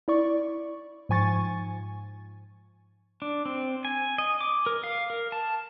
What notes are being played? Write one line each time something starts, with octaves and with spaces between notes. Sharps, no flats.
E4 D5 C#6
G#2 F3 G#5 C#6 A6
D4
C4
G#5
D#5
D6
A#4
F5
A#4
A5